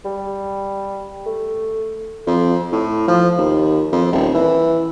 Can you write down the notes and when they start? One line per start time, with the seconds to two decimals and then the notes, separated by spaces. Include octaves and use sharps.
0.05 G3
1.26 A3
2.27 F2
2.72 A2
3.08 F3
3.38 D#2
3.92 F2
4.12 D#1
4.34 E3